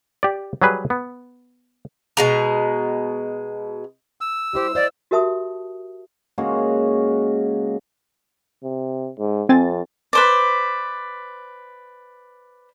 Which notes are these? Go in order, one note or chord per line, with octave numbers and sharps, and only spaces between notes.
G4 D5
F#3 G3 G#4 B4
B3
B2 G#3 A#5
E6
G3 E4 G4 C5
C5 D5 D#5 F5
F#4 G4 A#4 E5 A5 D#6
C#3 G#3 A#3 F#4
C3
G#2
F2 C4 G#5 A6
B4 C5 D5